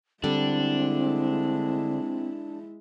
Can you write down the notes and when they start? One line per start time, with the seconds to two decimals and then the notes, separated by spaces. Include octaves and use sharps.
0.24 D3 G3 G#3 C4 D4 E4